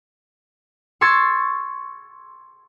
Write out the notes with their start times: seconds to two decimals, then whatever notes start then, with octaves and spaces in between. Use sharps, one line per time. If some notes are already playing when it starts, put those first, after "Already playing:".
1.01 C6 C#6 E6 G#6 A6 C7